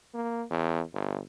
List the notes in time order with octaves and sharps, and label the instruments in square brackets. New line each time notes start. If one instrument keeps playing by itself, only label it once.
[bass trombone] A#3
E2
G1